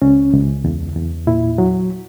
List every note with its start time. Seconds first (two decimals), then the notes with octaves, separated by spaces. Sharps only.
0.02 C#2 C#4
0.33 C#2
0.64 E2
0.96 E2
1.27 A#2 E4
1.58 F#3